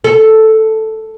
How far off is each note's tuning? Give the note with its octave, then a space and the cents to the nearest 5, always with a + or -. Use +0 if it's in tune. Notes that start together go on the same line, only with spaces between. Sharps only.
A4 +0